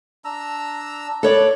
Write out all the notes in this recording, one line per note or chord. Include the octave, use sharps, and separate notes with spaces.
D4 A#5 E6
A4 B4 C#5 D5